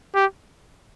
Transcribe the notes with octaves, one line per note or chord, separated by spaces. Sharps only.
G4